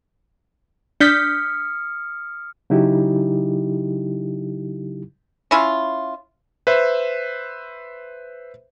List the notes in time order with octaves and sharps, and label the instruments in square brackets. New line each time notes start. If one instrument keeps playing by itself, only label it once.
[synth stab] D4 G6 B6 [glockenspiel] D#6 F6 C#7
[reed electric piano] C#3 F#3 D#4 E4 G4
[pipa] C#4 E4 F4
[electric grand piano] B4 C5 E5